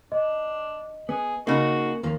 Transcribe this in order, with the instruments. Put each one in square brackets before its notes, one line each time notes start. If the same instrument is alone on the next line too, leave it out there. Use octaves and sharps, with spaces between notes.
[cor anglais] D4 [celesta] D#5
[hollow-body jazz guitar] B3 [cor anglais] G#4
[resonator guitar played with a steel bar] C#3 D#4 [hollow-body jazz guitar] A#3 [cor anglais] F#4
[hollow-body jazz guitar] D#2 F3 A#3